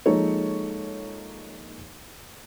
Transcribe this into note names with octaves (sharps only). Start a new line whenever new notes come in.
F3 G#3 A#3 D#4 A4 C#5